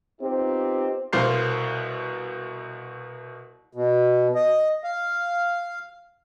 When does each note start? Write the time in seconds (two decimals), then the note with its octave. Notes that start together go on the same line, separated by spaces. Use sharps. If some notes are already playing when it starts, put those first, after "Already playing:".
0.21 B3 C4 D#4 F4 G4
1.13 C2 B2 C5 F5 C7
3.73 B2
4.35 D#5
4.84 F5